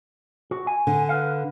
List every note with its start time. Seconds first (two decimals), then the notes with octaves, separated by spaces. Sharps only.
0.51 F#4
0.67 G#5
0.87 D3
1.09 B4 F5